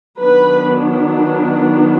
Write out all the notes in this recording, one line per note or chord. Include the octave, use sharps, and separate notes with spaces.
D#3 F#3 B3 D4 B4